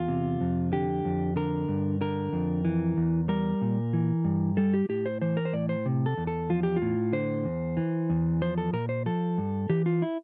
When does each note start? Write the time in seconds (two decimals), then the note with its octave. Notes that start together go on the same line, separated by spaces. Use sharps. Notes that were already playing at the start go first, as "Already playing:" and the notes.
Already playing: E2 F4
0.08 C3
0.41 F2
0.72 D3 G4
1.05 F2
1.36 D3 A#4
1.68 G2
2.01 D3 A#4
2.33 F2
2.65 E3
2.97 E2
3.28 G3 A#4
3.61 A#2
3.93 E3
4.24 G2
4.57 G3 A4
4.74 G4
4.89 A2 G4
5.06 C5
5.21 E3 C5
5.37 A#4
5.45 C5
5.53 A2 D5
5.69 C5
5.86 C3
6.06 A4
6.17 E2
6.27 A4
6.50 F3 F4
6.63 G4
6.76 F4
6.82 A2
7.13 D3 C5
7.45 E2
7.77 E3
8.10 E2
8.41 F3 C5
8.58 A4
8.73 A#2 A#4
8.89 C5
9.06 F3 A4
9.38 G2
9.70 E3 G4
9.86 F4
10.02 E4